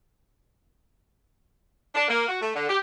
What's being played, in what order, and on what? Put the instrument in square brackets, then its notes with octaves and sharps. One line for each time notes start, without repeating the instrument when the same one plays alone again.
[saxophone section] D4
A#3
F#4
A3
D3
G4